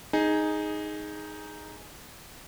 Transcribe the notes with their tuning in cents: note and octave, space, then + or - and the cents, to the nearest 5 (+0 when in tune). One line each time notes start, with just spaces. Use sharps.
D#4 +0 G#4 +0